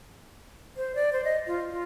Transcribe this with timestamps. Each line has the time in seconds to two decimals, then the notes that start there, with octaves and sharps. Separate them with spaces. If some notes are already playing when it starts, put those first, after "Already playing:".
0.77 C5
0.95 D5
1.12 C5
1.24 D#5
1.47 F4
1.70 F4